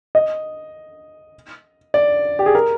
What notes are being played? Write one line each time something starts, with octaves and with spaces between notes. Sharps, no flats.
D#5
D5
G4
G#4
A#4